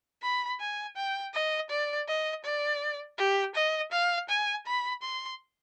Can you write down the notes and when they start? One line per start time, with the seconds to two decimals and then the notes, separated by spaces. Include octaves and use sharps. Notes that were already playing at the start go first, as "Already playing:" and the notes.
0.23 B5
0.60 G#5
0.96 G5
1.34 D#5
1.70 D5
2.08 D#5
2.44 D5
3.18 G4
3.55 D#5
3.92 F5
4.29 G#5
4.67 B5
5.02 C6